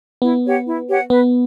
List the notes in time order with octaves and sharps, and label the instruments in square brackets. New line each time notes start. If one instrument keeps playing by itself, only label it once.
[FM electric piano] B3 [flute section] E4
[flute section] G4 C#5 F#5
E4
G4 C#5 F#5
[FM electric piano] B3 [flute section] B4